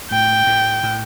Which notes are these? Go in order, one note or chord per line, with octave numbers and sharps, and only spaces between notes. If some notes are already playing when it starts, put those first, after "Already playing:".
A2 G5
A2
A2